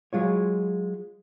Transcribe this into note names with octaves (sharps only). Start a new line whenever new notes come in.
F#3 G#3 F4 C#5